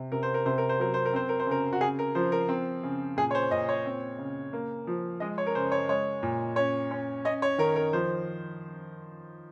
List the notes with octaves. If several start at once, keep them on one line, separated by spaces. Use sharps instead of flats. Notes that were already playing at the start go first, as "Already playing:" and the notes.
Already playing: C3
C3 A#4
C5
A#4
C3 C5
A#4
C5
F#3 A#4
C5
A#4
C4 C5
A#4
C5
C#3 A#4
F#4
C#3 G#4
A#4
F3 C5
A#4
C4
C#3
A#2 G#4
C#5
C5
A#2 D#5
C#5
C4
C#3
A#3
F3
G#3 D#5
C#5
A#4
C#3 C5
C#5
G#3 C#5
A#2
C#4 C#5
C#4
C#4 D#5
C#5
D#3 A#4
A#4
F3 C5